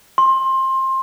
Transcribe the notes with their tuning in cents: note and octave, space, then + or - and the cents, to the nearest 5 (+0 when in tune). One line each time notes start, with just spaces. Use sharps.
C6 +20